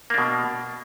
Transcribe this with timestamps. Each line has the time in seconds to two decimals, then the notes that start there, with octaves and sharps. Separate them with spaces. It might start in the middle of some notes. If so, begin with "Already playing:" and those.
0.10 A#3
0.14 D4
0.18 B2